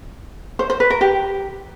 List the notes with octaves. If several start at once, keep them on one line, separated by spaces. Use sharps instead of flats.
C5
C5
B4
A#4
G4